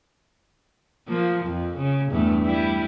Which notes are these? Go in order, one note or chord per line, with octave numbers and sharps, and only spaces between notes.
F3 A#3
F2
C#3
E2 G2 A3
G3 E4